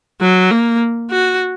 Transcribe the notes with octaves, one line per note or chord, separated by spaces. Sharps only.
F#3
A#3
F#4